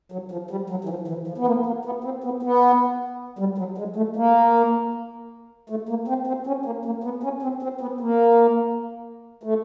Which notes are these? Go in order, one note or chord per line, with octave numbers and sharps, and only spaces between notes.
F#3
F3
G3
F#3
E3
F3
E3
F3
B3
A#3
A#3
B3
C4
B3
B3
G3
F#3
G#3
A3
A#3
A3
A#3
C4
C4
C#4
A#3
A#3
B3
C#4
C4
C4
B3
A#3
A3